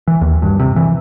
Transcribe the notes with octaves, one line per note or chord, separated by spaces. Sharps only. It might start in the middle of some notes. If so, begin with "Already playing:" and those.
E3
D#2
G2
C3
E3